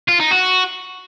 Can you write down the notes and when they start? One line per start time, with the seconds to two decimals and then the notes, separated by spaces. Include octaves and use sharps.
0.09 F4
0.20 D#4
0.31 F#4